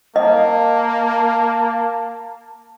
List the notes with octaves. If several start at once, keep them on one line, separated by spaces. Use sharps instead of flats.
A#3 D#5 A5